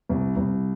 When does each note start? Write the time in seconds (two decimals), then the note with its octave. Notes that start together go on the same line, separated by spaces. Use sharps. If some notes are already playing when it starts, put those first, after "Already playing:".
0.09 C2
0.37 C2